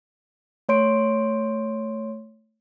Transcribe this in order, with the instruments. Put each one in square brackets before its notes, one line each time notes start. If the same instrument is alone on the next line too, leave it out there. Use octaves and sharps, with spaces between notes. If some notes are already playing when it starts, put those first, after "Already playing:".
[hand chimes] A3 C#5 C6 D7